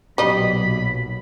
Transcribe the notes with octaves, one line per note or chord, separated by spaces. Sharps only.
B1 A#2 F#3 G3 D#5 B5